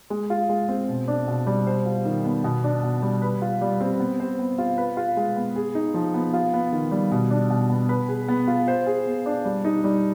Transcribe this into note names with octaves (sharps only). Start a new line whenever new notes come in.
G#3
F4
G#3
C4
B2
D4
B2
G3
C5
F4
D#3
B3
B2
D4
B2
G3
B4
F4
G3
C4
B3
C5
B3
F4
B4
F4
G#3
B3
G#4
D#4
F3
B3
F4
B3
D#3
G3
B2
D4
B2
B3
B4
G#4
B3
F4
C5
G#4
B3
D4
G3
D#4
G3